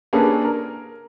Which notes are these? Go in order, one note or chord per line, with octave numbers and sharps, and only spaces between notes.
A#3 C#4 D4 G#4 A4 B4
A#4